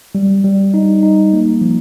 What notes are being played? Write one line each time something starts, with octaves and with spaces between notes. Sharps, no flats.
G3
G3
D#4
D#4
A#3
F3